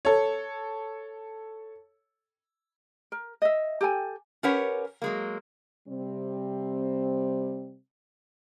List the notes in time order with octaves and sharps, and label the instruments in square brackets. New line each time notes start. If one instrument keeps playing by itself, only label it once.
[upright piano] A4 C#5
[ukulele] A#4
D#5 E5
G4 A4 G5 G#5
[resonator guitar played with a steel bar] C#4 G4 A#4 B4 C#5 F#5
F#3 G#3 A#3
[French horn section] C3 G3 C4